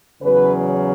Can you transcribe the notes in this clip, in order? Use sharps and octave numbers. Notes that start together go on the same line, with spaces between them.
E2 C#3 F#3 B4